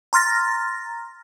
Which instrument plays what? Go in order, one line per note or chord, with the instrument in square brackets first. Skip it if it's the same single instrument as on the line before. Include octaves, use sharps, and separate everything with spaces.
[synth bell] A#5 C6 F6 A6 A#6